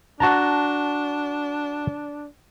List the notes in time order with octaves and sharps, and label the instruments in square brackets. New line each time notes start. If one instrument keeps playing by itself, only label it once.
[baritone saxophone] D4 [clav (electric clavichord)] F#4 A5 A#5